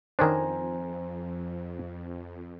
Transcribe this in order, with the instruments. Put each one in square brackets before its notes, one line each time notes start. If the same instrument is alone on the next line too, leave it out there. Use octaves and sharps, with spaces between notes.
[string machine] F2 [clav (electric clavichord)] D#3 C#4 D4 [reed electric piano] C5 G#5 A#5